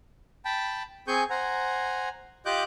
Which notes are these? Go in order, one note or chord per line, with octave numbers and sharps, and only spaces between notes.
G5 A5 B5
C4 G#4 G#5 C#6 G6
C5 F#5 G#5 A#5
F4 G4 D#5 D6 F#6 G6